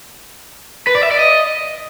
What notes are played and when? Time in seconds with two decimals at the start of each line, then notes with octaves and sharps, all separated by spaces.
0.87 B4
0.95 D5
1.03 E5
1.11 D5
1.19 D#5